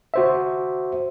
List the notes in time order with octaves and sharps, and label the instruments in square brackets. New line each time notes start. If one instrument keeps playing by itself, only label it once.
[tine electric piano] F#4 C5 E5